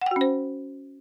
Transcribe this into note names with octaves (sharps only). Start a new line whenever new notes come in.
C#4 F#4 C5 F#5 G5